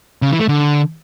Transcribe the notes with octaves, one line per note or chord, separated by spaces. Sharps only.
C#3
E3
A3
D3